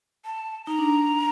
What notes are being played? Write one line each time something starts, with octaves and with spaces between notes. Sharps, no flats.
A5
D#4 A#5
D4